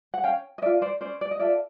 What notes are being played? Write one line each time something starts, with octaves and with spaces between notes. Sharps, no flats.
F#5
C#4 F5 G5
D#5
F4 A4 D5 E5
C5 D5
C#4 C5 D5
D5
D#5
F4 A4 D5 E5